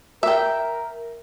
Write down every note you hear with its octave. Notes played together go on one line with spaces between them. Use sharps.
A#4 E5 G5